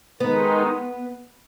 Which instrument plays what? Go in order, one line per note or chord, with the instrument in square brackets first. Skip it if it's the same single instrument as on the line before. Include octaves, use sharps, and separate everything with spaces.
[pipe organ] D#3 G#3 D#4 [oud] B3